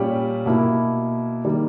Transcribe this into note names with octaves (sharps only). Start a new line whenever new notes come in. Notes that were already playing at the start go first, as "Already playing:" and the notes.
Already playing: A#2 G3 C#4 G4
B2 A#3 E4
D#3 G3 A#3